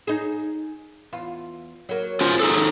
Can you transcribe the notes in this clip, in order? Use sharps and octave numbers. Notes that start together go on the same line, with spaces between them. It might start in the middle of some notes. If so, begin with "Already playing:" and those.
D#4 G#4
E2 F4
F#3 A#3
C#4 F4 C5
D#4 G#4 A4